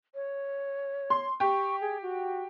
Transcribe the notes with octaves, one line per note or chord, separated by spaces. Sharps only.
C#5
C6
G4 C#6
G#4
F#4